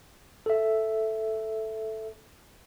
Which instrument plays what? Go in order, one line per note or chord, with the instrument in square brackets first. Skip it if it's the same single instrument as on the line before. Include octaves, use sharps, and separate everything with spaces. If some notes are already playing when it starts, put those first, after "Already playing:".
[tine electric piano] A4 E5